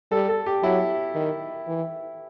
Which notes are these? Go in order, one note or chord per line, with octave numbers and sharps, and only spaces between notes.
G3 A4
A4
G4
F#3 E4
D#3
E3